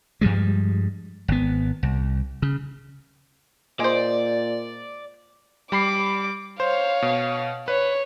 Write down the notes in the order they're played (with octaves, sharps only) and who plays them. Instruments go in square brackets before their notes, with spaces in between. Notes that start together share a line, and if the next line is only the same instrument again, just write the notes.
[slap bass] G2 F3 G3 G#3
G#1 B3
C2
C#3
[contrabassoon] A#2 [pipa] G#3 C5 [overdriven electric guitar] D5
[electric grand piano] G3 B5 C7 [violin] D6
[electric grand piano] C5 [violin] C#5 F5
[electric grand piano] B2
[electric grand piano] B4 [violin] C#5